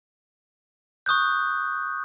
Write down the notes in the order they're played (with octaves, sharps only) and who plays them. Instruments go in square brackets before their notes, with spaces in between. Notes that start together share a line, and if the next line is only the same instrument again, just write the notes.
[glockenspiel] C#6 D#6 F#6 G6